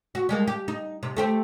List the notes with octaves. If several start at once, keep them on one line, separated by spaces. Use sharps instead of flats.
F#4
G3 G#3 A#3
G4
D#4
C3
A3 G4 C5